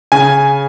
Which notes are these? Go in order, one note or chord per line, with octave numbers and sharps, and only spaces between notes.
C#3 G#5